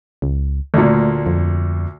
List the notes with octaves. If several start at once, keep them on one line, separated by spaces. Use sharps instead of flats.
C#2
D2 A#2 A3
F2